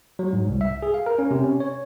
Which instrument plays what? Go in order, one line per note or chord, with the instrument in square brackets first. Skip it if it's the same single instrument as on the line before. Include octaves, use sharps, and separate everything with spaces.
[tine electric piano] F#3
G#2
C2
E5
G#4
F5
A#4
C#4
C3
C#4
C#5